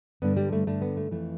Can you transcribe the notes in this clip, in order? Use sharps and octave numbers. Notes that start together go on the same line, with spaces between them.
G2 D3 B3
G3
A3
G2 D3 A3
B3
A3
F2 E3 A3